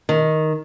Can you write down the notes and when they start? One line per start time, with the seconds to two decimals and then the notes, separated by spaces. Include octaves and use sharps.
0.09 D#3